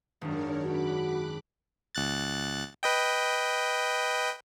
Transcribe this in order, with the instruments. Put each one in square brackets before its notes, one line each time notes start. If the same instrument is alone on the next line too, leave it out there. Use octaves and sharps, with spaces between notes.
[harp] G#1 F#2 [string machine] D4 A#4 C#5
[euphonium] F#4 [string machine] B5 D6 F#6
[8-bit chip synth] C#2 F#6 A6
B4 D#5 G5